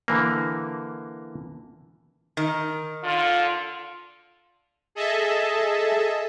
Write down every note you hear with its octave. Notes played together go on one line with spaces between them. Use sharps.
D3 E3 A#3
D#3
D3 F4
G#4 A4 D#5 E5 A5